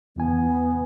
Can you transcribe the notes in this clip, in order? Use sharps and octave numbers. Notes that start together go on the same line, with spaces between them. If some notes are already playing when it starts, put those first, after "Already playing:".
E2 E3 B3 G#5